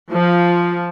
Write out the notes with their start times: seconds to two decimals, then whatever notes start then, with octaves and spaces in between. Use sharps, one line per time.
0.11 F3